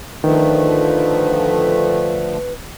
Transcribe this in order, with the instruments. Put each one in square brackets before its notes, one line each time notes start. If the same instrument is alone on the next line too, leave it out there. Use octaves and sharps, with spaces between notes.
[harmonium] D3 F3 A3 [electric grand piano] D#3 [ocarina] B4